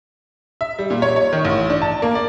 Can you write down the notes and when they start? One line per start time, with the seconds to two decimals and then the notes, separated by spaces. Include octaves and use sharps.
0.61 E5
0.79 G3
0.90 A#2
1.02 C#5
1.16 C#5
1.33 D#3
1.45 A1
1.70 D4
1.82 A5
2.02 A#3
2.15 D5